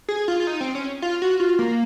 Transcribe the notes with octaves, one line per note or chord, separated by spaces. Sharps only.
G#4
F4
F4
D#4
C4
C#4
F4
F#4
F4
A#3